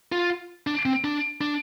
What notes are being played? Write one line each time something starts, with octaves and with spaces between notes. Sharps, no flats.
F4
D4
C4
D4
D4